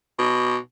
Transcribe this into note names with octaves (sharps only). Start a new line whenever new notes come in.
B2